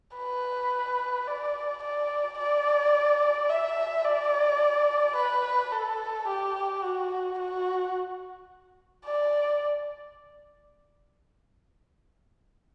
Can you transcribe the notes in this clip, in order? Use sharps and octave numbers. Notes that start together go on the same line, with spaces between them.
B4
D5
D5
D5
E5
D5
B4
A4
G4
F#4
F#4
D5